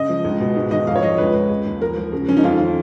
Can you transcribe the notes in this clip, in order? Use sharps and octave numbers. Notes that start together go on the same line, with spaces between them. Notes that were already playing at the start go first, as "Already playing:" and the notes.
Already playing: C#3 D#5
F3
C#2
B2
G#2
D#3 D#5
F2 F5
C#5
F3 D#5
C#2 B4
C#2
C#3
D#2
F3 A#4
F3
C#3
F3 C#4
D#4
F2 F4
D#3